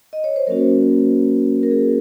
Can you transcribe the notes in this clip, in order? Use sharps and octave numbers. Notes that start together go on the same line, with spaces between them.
D#5
C#5
C5
F#3 A#3 C#4 F#4 A#4
A#4
G#4